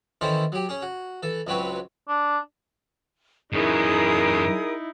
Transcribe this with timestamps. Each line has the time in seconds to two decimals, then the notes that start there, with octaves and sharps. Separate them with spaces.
0.21 D#3 E3 C#4 E4 A4 C5
0.52 F#3 G4
0.69 C#4 G#4
0.82 F#4
1.23 E3 A4
1.47 C#2 F#3 C4 B4 C#5
2.08 D4
3.53 F#2 E3 D#4 E4 G#4 A#4 D#6